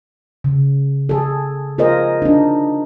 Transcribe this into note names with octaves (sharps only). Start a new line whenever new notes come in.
C#3
G#4 A4
F4 G#4 A#4 C5 D#5
D4 D#4